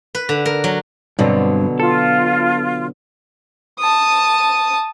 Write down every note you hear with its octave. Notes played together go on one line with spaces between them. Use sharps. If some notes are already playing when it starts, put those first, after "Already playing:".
B4
D3
A#4
F#3
G2 B2 D3 F#3 C4
F4 A4
A5 D#6